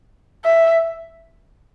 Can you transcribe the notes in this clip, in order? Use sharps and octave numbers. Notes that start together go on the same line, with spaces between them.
E5